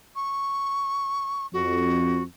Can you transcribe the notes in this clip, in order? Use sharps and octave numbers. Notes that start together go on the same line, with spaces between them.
C#6
F2 F#4